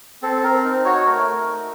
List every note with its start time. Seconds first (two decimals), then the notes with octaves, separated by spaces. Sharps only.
0.22 C4 A4
0.43 C4 A#4
0.64 D#4
0.85 F#4 C#5
1.05 A3 A#4
1.27 A3
1.47 D#4